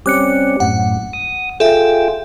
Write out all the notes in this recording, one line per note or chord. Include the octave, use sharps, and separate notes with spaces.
G3 C4 C#4 D6 F#6 C#7
F#2 A2 F#5
D#6
F4 G#4 A4 E5 G5